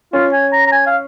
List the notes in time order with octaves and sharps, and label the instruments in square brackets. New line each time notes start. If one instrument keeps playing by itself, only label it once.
[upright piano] C#4 [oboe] F4
[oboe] G#5
A#5
A#5
G#5
F5